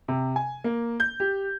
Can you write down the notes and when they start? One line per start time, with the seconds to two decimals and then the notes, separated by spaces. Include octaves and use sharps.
0.08 C3
0.36 G#5
0.64 A#3
1.00 G6
1.20 G4